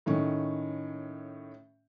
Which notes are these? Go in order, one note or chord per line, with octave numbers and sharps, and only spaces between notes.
A2 D#3 C#4